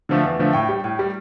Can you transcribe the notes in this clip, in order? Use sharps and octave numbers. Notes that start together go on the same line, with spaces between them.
D3 F3 A3
E2
D3 F3 A3
A2 G5
G3
A2
G3